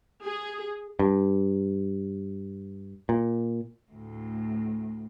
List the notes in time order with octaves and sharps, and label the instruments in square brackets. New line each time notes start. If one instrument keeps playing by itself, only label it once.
[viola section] G#4
[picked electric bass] G2
A#2
[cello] D2 A2